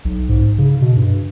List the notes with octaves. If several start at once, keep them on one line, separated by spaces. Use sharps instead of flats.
B1
G#2
C#3
B2
G2